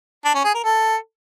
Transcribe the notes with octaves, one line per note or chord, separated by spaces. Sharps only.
D4
C#4
G#4
A#4
A4